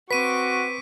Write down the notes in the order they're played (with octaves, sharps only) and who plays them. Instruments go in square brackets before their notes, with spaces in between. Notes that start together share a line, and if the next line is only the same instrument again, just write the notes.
[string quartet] C4 C#6 D6 [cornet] F#4 [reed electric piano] B4 [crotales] B6 D#7